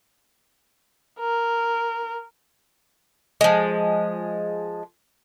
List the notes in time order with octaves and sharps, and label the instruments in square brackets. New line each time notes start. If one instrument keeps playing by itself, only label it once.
[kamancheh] A#4
[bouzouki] F3 G#3